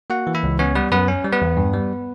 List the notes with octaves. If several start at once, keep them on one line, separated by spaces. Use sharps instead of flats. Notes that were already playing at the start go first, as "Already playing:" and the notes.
A#3 F#4 F#5
E3
E4 E5
C#2
B3 C#4 C#5
G3 B3 B4
F#2 B3 B4
C#4
G3
B3 B4
E2
G2
G3